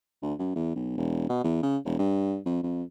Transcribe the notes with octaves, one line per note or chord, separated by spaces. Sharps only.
D2
F#2
E2
B1
E1
B2
E2
C#3
E1
G2
F2
F2